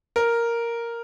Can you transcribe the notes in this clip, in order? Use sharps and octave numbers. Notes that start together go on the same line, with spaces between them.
A#4